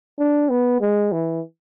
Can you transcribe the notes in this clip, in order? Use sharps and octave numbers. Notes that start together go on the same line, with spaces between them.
D4
B3
G#3
E3